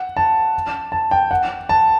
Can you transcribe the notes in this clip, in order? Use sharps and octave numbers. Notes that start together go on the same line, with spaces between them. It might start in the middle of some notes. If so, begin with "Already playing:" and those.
Already playing: F#5
A5
A5
G5
F#5
A5